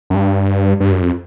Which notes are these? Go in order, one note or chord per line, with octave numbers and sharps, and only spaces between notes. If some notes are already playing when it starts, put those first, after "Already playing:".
F#2
G2
G2
F#2
F2